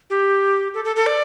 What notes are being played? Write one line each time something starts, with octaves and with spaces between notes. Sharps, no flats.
G4
A4
A4
A4
D5